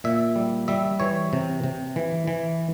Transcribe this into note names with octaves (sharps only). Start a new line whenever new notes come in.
A#2 E5
G3
G3 E5
E3 C#5
C3
C3
E3
E3